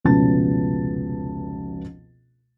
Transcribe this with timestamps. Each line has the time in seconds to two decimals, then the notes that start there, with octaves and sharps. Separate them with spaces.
0.04 F1 C#2 B2 C#4 A5 A6